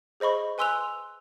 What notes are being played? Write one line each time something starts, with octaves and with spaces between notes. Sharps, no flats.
G#4 C5 D#5 B5 C#6
B4 G#5 C6 E6 F#6 F7